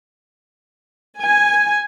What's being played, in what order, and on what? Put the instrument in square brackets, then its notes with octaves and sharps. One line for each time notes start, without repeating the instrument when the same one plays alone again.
[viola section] G#5